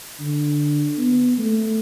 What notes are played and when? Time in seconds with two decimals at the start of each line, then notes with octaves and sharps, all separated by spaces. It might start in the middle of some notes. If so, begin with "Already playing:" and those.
0.19 D3
0.98 B3
1.38 A3